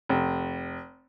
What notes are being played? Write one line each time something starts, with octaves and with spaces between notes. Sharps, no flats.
F1